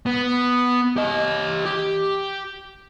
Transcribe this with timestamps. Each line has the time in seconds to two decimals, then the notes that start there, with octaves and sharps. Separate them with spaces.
0.06 B3
0.96 G4 D#5
1.66 G4